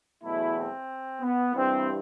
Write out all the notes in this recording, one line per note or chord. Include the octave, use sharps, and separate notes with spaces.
E2 B2 F#3 A3 E4
C4
B3
G2 E3 G3 C4